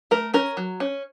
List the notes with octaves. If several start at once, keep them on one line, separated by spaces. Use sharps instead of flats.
A3 A#4
C#4 A#4
F#3
C#4